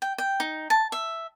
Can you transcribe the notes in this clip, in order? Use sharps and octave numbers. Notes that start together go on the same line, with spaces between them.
G5
G5
D#4
A5
E5